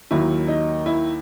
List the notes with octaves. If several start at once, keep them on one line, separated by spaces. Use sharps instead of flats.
D#2 D#3 F#3 E4
D#4
E4